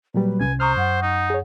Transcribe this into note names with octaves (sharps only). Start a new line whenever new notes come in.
A#2 F#3 G3 B4
C2 C3 C#4 G#5
C5 A#5 C#6 D#6 F6
F#2 F#5
D#4
G#4 C#5